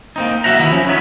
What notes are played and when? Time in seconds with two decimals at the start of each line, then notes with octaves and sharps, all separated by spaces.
0.16 A#3 C4 D#4
0.44 C2 F#4 E5 F#5 A#5
0.59 D#3 B3 E4
0.71 F3 C#4
0.87 D#3 F#3 B3 C#4